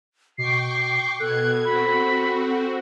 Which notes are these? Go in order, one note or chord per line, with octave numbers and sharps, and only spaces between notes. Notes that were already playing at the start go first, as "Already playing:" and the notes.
B2 G5 C#6 D6 C7
B2 A4 F#6 G#6
C4 F#4 B5